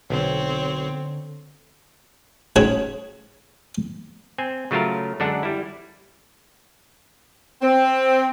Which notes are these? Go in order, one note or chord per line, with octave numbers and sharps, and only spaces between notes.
B1 D3 C4 C#5
C#3 F#4 C#5
C4 G#5
C#3 F#3 A3 F4 A#4
F#2 D3 G#3 D4 A4 F#5
G3 E4
C4